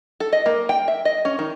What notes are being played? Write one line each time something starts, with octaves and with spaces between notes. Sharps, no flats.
A4
D#5
A#3
G5
E5
D#5
C#4
D#3